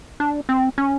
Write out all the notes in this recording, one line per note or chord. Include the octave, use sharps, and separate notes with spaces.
D4
C4
C#4